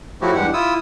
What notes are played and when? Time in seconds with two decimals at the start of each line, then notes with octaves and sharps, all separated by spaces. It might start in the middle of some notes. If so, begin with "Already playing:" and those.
0.21 F3 F#3 A3 E4 F#4 G4
0.35 E2 G2 G#3 G4 F#5
0.53 E4 F4 D#6 E6